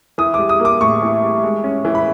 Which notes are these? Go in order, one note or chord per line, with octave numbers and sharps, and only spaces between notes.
E3 D#6
G3 D6
D#6
A#3
D6
A2 C#6
E3
G3
G#3
C#4
E3
B5